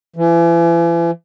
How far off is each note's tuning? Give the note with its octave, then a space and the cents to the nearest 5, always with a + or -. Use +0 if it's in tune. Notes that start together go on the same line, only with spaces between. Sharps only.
E3 +40